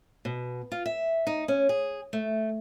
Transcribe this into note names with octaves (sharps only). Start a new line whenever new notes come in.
B2
F4
E5
D#4
C#4
G#4
A3